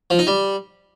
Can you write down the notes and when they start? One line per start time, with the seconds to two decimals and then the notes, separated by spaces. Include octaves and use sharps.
0.10 F3
0.19 D#4
0.27 G3